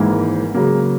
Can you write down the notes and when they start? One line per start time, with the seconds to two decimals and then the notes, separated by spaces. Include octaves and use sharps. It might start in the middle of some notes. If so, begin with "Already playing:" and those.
Already playing: G#1 G#2 E3 A#3 E4
0.55 C#3 F#3 A#3